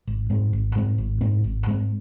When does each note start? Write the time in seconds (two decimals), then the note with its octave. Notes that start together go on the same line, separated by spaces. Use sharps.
0.07 G#1
0.30 G#2 G#3 C4
0.53 G#1
0.75 G#2 G#3 C4
0.98 G#1
1.21 G#2 G#3 C4
1.44 G#1
1.67 G#2 G#3 C4